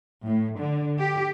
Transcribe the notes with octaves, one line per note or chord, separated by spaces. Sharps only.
A2
D3
G4